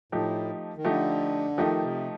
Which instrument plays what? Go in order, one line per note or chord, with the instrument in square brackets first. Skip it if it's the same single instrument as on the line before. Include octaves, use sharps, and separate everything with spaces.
[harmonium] A2 [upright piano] F3 A3 D#4 G4
[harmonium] D#3
[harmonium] D3 [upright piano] F3 A3 D#4 G4
[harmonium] D#3 [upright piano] F3 A3 D#4 G4
[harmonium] C3